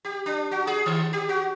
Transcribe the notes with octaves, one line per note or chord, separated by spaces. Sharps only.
G4
D4
F#4
G#4
D#3
G4
F#4